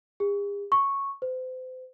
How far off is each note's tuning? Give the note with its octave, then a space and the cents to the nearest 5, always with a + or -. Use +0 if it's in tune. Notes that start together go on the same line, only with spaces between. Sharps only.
G#4 -45
C#6 -5
C5 -35